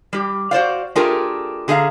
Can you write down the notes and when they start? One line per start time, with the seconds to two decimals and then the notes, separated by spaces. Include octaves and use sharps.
0.13 G3 G4
0.51 F#4 C5 D5 F5
0.95 A3 D4 F4 G4 G#4 A#4
1.68 D3 G#4 A4 D#5 F5 A#5